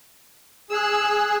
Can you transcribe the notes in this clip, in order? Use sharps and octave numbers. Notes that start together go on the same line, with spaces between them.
G#4 E6 F#6